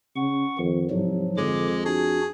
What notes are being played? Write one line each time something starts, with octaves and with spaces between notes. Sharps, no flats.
C#3 F#5 C#6
F2 D#3
C2 G#2 F3 F#3
F2 D3 G#3 D6
D4 F#4 G#4